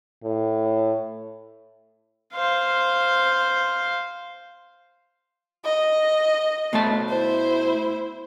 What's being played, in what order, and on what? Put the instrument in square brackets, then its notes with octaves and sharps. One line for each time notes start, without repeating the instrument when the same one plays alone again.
[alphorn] A2
[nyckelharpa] C5 F5
[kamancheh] D#5
[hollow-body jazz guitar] B2 A3 A5
[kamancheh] E4 C5